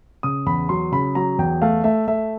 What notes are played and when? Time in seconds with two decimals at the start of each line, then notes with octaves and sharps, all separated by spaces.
0.23 C#3 D#6
0.46 E2 B5
0.69 F#3 C6
0.92 C#3 B5
1.15 F#3 A#5
1.38 E2 G5
1.62 A3 F5
1.84 A3 E5
2.08 A3 E5